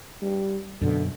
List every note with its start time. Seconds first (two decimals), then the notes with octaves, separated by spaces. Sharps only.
0.22 G3
0.81 F#2 B2 D3